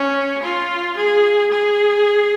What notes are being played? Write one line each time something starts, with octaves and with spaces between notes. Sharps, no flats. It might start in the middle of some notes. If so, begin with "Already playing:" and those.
Already playing: C#4
F4
G#4
G#4